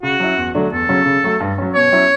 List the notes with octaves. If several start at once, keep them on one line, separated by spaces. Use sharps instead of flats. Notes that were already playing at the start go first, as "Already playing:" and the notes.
C#3 F#4
F#3 C#4 E4
E2
D3 F#3 A3 D4
E2 A4
C#3 F#3 C#4
C#3
F#3 A3
G2
F#3 C#4
B2 C#5
F#3 C#4 E4